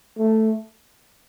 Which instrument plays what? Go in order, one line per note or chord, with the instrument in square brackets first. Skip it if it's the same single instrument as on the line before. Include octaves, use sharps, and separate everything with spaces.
[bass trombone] A3